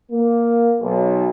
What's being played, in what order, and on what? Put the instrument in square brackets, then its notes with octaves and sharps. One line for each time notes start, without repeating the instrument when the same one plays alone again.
[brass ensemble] A#3
B1